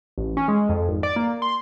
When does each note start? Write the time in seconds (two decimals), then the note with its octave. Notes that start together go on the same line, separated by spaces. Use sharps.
0.18 A1
0.37 C#4
0.48 G#3
0.69 F2
0.88 G#1
1.03 D5
1.16 A#3
1.42 C6